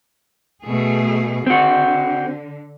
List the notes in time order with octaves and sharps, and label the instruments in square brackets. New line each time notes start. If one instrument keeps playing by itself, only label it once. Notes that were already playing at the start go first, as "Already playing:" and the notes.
[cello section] B2 A3 G#4
[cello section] D3 [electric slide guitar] C4 F#4